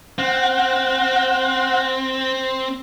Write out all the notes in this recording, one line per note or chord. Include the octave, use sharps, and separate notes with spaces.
C4 F#5